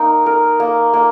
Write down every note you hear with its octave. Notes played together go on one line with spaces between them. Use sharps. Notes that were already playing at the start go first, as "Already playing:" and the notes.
Already playing: A#3 D#4 A#4
A#4
A#3
A#3